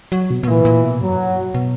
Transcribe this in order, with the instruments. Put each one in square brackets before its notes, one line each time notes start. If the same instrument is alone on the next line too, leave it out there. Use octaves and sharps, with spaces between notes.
[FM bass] F#3
B2
B2
[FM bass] A#2 [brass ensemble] E3
[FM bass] A#2
B2
[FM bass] G2 [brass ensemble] F#3
[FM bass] F#2
G2
B2